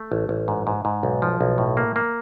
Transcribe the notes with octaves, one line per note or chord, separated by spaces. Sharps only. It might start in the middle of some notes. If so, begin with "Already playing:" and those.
Already playing: A3
A1
A1
G#2
G#2
G#2
B1
F3
B1
A2
A#3
A#3